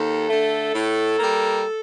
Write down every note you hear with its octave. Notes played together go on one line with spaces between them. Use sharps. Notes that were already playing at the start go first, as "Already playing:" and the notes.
Already playing: D#2 A4
D3 A3
A2
G3 A#3